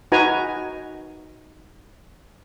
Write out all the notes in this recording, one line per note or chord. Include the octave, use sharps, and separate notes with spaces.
D#4 F#4 B4 G#5 A#5